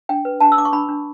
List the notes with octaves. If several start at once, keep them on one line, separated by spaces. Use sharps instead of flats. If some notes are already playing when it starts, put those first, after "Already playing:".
D4 G5
B4
D4 A5
E6
D4 D6
C#6
D4 B5
D4